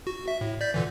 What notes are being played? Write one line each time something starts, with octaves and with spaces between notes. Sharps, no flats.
F#4
E5
A2
D5 G6 B6
A#2 D3 E3